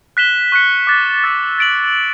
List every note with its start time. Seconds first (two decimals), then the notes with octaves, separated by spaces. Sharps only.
0.17 F#6 B6 E7 G7
0.52 C#6 F#6 C#7
0.87 D6 F#6 A6
1.24 E6 A6 C#7
1.58 A6 D7 F#7